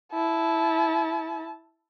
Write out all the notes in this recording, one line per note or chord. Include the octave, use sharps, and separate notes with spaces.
E4 A5